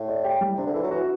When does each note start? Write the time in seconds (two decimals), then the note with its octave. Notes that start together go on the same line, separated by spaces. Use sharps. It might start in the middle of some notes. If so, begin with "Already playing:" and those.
Already playing: A2
0.09 D5
0.24 G4
0.41 G3
0.57 C3 D4
0.66 D3
0.74 E3 A4
0.83 F#3
0.91 E3 F#4